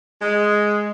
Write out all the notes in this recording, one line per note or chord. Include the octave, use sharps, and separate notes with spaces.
G#3